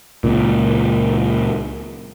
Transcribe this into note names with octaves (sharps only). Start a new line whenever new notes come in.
C#2 A#2